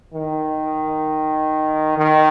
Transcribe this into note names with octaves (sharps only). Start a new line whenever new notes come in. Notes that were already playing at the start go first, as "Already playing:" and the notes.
D#3
D#3